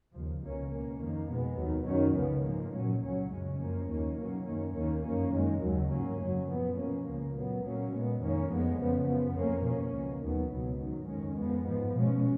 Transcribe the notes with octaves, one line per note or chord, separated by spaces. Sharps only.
D#2 C#3 F3
C#2 B2 A#3 C#4
B2 A#3 C#4
F2 D#3 A#3
B2 G#3 B3
D#2 D#3 F#3
F#2 D#3 F#3 C#4
C#2 C#3 F3 B3
G#2 F3 A#3
A#2 F#3 C#4
C#2 C#3 F#3 C#4
F#2 C#3 G#3 C#4
F#2 F3 A#3 C#4
D#2 D#3 A#3 C#4
B2 F#3 A#3 C#4
F#2 D#3 A#3 C#4
D#2 D#3 A#3 C#4
F#2 F3 A#3 C#4
F#2 D#3 G#3
D#2 C#3 F#3
G#2 F#3 A#3 C#4
F#2 C#3 F#3
A#2 F3 B3
B2 A#3 C#4
C#2 C#3 F3 A#3
A#2 F#3 B3
A#2 F#3 A#3 C#4
A#2 G#3 B3
F2 D#3 A#3 C#4
F2 F3 G#3 B3
F2 C#3 F3 B3
F#2 F3 B3
F2 F3 A#3 C#4
B2 A#3 C#4
C#2 B2 A#3
D#2 D#3 F#3 B3
C#2 B2 F#3 B3
G#2 D#3 F#3
F2 D#3 G#3 C#4
F2 F3 G#3 B3
G#2 F3 B3
B2 G#3 C#4